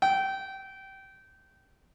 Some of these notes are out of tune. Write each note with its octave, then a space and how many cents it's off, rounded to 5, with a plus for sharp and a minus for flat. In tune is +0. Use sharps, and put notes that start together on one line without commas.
G5 -20